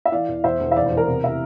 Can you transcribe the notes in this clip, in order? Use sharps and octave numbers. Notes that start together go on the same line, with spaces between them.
E5
E3 D5 F5
E2
E2 C5 E5
E1
E5
F1 D5 F5
C5
E2
A#4
C3
C3 E5